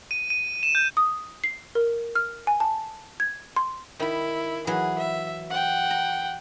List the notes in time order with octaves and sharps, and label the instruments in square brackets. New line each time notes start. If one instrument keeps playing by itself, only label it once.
[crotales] D#7
D#7
E7
G6
[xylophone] D#6
C7
A#4
F6
G#5
A5
G#6
C6
[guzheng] D#3 B5 [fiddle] E4
[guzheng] E3 F#3 B4 [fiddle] G#4
[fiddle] E5
F#5 G5
[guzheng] A#5